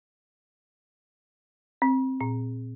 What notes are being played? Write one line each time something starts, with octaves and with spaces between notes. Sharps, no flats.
C4
A#2